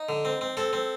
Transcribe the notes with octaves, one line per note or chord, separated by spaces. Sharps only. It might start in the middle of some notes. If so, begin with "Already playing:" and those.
Already playing: D#4
D3
C4
C4
C4 A4
C4